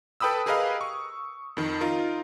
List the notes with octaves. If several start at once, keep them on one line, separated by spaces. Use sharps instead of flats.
A4 B4 G5 B5 D#6 E6
G4 G#4 A#4 B4 D#5 F5
C#6
F2 D#3
D#4 F4 A#4